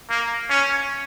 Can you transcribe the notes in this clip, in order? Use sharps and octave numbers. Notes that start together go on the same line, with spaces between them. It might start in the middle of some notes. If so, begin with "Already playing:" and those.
A#3
C#4